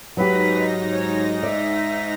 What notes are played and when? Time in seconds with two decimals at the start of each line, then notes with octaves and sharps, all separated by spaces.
0.17 G#2 F#3 D#4 G4 B4 A#6
0.90 C#5
1.43 D5 E5